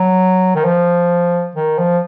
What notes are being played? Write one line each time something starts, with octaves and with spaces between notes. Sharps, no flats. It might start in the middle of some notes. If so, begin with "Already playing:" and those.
Already playing: F#3
D#3
F3
D#3
F3